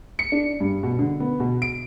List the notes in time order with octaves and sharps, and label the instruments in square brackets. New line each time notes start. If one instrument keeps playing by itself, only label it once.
[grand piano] C#7
D4
G2
B2
D3
B3
B2
D7